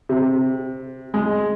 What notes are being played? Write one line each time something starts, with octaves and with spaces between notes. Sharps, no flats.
C3
G#3